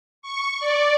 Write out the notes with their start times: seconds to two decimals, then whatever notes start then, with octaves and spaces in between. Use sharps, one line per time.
0.22 C#6
0.60 D5